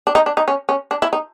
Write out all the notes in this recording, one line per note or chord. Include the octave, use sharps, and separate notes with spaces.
D4
D#4
D4
D#4
C#4
C#4
D4
E4
D#4